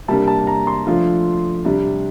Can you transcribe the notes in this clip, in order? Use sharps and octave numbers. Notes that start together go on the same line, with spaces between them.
C3 G3 A#3 D4 A5
A5
A#5
C6
F3 A3 D4 F4
C3 G3 D4